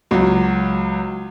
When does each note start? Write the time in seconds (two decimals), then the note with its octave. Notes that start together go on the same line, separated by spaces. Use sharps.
0.11 C#2 F#3